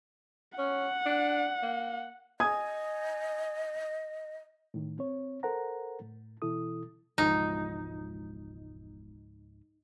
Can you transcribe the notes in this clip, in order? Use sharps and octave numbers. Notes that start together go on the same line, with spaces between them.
C#4 F#5
D4
A#3
D#5 G#5 D#6 G#6
A2 D#3
C4 C#5
A4 A#4 C5 F#5 A#5
A2
B2 E3 E4 A4 D#6
E1 C#2 G#2 F3 D#4